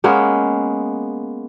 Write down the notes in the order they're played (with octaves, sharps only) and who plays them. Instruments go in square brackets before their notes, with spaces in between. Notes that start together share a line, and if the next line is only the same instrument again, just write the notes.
[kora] G#3 A#3 B3 C#4